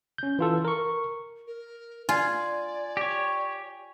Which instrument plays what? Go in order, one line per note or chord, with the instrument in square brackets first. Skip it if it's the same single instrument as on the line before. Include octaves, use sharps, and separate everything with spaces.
[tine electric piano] C#4 G6
E3 F4 A4
A#4 C#6
[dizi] A#4
[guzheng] F4 [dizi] D5 [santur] G#5
[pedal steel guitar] G4 C#5